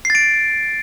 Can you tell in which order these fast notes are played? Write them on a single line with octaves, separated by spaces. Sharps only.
C7 A6 D7